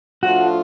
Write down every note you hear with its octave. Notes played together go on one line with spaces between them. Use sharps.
A2 F3 A3 D4 F4 F#4